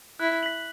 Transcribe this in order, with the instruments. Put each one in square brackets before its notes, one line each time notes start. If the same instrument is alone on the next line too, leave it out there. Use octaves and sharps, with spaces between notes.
[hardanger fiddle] E4 [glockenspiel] F#6
[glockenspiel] B6 F#7